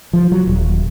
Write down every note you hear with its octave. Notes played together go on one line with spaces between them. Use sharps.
F3
F#3
D#1